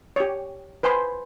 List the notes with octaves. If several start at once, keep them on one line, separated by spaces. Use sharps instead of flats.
G4 C#5
B4 C5 G#5 C6